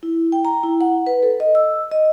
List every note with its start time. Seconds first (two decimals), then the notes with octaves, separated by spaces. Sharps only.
0.03 E4
0.32 G5
0.45 A#5
0.63 E4
0.81 F#5
1.07 B4
1.23 A4
1.40 D#5
1.55 E6
1.92 D#5